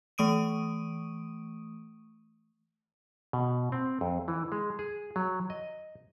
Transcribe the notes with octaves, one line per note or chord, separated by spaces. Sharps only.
E3 A3 C#6 D#6 D7 D#7
B2
C4
F2
E3
G#3
G#4
F#3
D#5